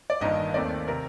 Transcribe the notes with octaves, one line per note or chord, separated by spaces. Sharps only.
D5
G1 G2 D#3 A#3 D#5
D#2 D#3 A3 C4 D5
C3 A#4